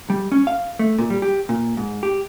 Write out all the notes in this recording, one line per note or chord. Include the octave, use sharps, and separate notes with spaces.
G3
C#4
F5
A3
A#2
G3
G4
A#2
G#2
G4